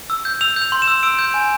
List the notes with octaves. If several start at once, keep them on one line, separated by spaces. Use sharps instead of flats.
E6
G6
E6 F7
G6
F7
C6
E7
E6
E6 D7
G6
G#5